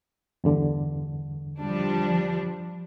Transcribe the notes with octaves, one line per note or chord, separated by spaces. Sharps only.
E2 G2 D3
F3 G3 D4